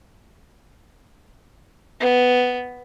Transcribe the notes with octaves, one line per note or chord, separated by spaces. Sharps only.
B3